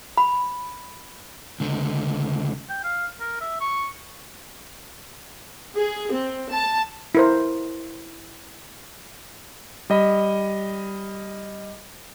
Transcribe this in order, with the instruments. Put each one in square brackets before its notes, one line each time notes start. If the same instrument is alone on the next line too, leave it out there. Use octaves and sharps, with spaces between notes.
[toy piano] B5
[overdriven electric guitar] C#2 D3
[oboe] G5
F5
A#4
E5
C#6
[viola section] G#4
C4
A5
[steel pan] E4 A#4 C5
[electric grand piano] G3 D#5 B5